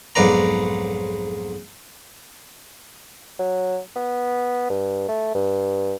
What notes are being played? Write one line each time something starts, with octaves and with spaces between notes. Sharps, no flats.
B1 F2 G#2 B4 D5 A#5
F#3
B3
G2
A3
G2